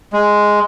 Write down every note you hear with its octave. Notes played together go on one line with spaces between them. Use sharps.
G#3